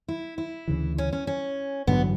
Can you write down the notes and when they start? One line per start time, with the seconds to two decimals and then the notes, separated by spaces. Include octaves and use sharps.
0.08 E4
0.38 E4
0.68 D2 C#3 E3
0.98 C#4
1.13 C#4
1.27 C#4
1.87 A1 G2 D3 F#3 B3